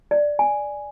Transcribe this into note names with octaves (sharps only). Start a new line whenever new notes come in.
D5
G#5